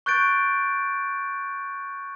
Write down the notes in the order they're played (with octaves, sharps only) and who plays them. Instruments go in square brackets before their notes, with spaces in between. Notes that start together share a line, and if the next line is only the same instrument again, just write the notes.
[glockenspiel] C#6 F#6 G6 A6 D7